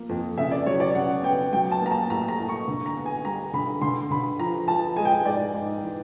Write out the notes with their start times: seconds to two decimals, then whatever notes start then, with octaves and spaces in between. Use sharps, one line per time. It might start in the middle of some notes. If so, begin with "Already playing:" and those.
Already playing: F3 A#3
0.09 F2
0.37 C#3 E5
0.51 D5
0.66 F#3 C#5
0.80 D5
0.95 C#3 F#5
1.23 B3 G5
1.52 F#3 G5
1.71 A5
1.81 A#3 A#5
1.91 A5
2.10 A2 A#5
2.28 A#5
2.39 A2
2.49 C#6
2.68 D3
2.86 A#5
2.96 B3
3.06 G#5
3.25 G3 A#5
3.53 D3 B5
3.82 D3 C6
4.11 D3 B5
4.39 F3 A#5
4.68 F3 A5
4.96 G#3 G#5
5.05 G5
5.12 G#5
5.25 G#2 D5
5.54 G#2
5.83 E3